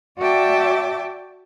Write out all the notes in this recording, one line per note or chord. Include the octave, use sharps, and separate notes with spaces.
F#4 D5 E5 G5 A5 D6